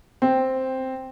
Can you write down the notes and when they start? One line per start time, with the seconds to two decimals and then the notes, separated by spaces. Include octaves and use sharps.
0.22 C4